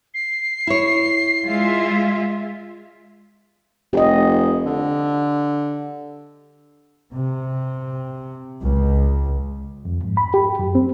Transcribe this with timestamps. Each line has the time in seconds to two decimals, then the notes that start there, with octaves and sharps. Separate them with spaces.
0.14 C7
0.67 E4 C#5
1.45 G#3 F4 E5
3.93 F1 G4 D#5
4.66 D3
7.14 C3
8.61 C#2
9.85 F2
10.03 G#2
10.17 B5
10.34 G4
10.59 F#2
10.75 C4